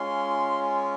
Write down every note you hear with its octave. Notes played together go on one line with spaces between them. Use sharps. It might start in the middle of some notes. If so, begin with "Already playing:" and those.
Already playing: G#3 C#4 F4 C6